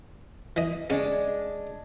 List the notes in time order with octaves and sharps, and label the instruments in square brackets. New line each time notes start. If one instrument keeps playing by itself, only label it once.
[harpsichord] E3 D#5
[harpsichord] C#3 C#4 [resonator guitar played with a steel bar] G#3 D4